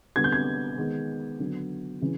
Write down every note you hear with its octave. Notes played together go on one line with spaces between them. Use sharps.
D3 G3 B3 G#6
G6
G#6
D#3 G#3 B3
D3 F#3 B3
C#3 E3